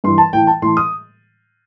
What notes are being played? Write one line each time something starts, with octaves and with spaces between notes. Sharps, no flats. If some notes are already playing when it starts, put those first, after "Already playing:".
G2 E3 C6
A5
A2 E3 G5
A5
A2 E3 C6
D#6